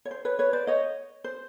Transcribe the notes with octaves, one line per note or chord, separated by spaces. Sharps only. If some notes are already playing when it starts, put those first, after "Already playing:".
C#5
C5
B4 C#5
B4 C#5
C5 D5
C#5 D#5
C5